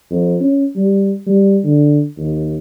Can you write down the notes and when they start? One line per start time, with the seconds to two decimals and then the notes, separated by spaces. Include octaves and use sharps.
0.11 F2
0.40 C#4
0.75 G3
1.27 G3
1.64 D3
2.17 D#2